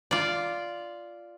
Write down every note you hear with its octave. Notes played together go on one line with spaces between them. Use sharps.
F4 D5